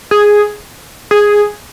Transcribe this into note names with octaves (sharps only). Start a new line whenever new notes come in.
G#4
G#4